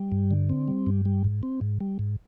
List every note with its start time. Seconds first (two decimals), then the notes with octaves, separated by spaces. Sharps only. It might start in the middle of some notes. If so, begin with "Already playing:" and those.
Already playing: G3
0.12 G2
0.31 D3
0.49 C4
0.68 G3
0.87 G2
1.05 G3
1.24 G#2
1.43 C4
1.61 G#2
1.80 G3
1.99 G#2